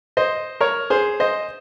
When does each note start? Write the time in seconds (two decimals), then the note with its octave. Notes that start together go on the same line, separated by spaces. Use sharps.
0.17 C5 D#5
0.61 A#4 C#5
0.90 G#4 C5
1.20 C5 D#5